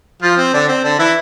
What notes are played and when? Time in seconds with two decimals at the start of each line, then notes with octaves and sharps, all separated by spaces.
0.22 F3 F4
0.37 C4
0.54 D3 D4
0.68 C4
0.84 D3 D4
0.99 E3 E4